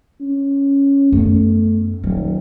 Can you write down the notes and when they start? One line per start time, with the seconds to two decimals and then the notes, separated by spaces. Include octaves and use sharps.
0.20 C#4
1.12 F#2 A3 B3
2.03 D#1 F#3